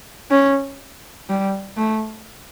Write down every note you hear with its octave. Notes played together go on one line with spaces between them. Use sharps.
C#4
G3
A3